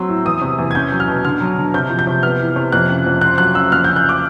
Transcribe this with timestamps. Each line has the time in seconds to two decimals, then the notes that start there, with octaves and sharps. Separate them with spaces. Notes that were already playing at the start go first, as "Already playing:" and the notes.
Already playing: F#3 C4 E6
0.09 A2
0.25 E2 D#6
0.42 C3
0.59 E2
0.71 G#6
0.75 C#4 G6
0.92 F#3
1.00 F6
1.08 B2
1.25 D3 F6
1.41 F#3
1.58 D3
1.74 C3 G6
1.90 F3
1.99 G6
2.07 C3
2.23 B3 F6
2.40 E3
2.56 C3
2.72 F2 F#6
2.90 C#3
3.06 F2
3.21 C4 F#6
3.38 F#3 F#6
3.55 C#3 E6
3.72 F2 F6
3.84 C#3 G6
3.96 F#6
4.09 D6